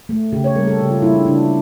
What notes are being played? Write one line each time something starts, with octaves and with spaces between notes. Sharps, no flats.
A3
C#3 G4
C#5
G3 A#3 A#4
A4
C#3 G4
F4
G3 A#3 E4
D4
C#3 D4